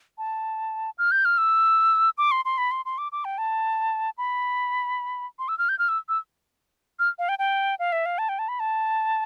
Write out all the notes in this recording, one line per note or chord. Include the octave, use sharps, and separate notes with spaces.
A5
F6
G6
F6
E6
D6
C6
C6
B5
C6
C6
D6
D6
G5
A5
B5
C6
E6
F6
G6
F6
E6
E6
F6
F5
G5
G5
F5
E5
F5
A5
G5
A5
B5
A5